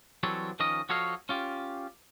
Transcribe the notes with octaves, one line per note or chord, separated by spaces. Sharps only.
E3 F#3 G3 C4 A4 C#5
D#3 F3 C#4 A#4 D#5
F3 F#4 A4 C#5 D#5 F5
C#4 F4 G4